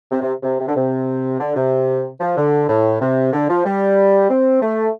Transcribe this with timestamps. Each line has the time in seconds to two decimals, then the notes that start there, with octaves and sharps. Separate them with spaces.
0.11 C3
0.22 C3
0.43 C3
0.59 C3
0.68 D3
0.76 C3
1.40 D3
1.56 C3
2.20 F3
2.37 D3
2.69 A2
3.01 C3
3.33 D3
3.49 F3
3.65 G3
4.30 C4
4.62 A3